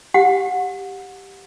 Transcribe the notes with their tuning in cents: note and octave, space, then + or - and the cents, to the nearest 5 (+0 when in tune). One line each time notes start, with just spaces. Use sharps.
G4 +0 F#5 -30